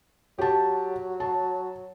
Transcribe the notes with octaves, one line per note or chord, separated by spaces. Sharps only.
F#3 G4 A5
A5